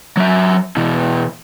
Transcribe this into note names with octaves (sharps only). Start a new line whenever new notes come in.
F#3 E5
B2 E3